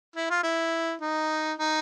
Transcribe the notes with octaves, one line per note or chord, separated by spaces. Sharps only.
E4
F4
E4
D#4
D#4